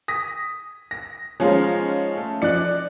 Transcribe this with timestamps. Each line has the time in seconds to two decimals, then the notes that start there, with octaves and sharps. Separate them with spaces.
0.08 D#6 A#6 B6
0.91 A#6
1.40 F3 G#3 C#4 D#4 F4 F5
2.17 A3
2.42 F3 D5 D#5 F#6 C#7